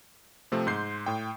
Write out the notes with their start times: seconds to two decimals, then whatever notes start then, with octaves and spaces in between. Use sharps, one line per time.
0.52 C3 F3 A3 C4
0.67 G#2 C6 G6 C7
1.06 A2 G5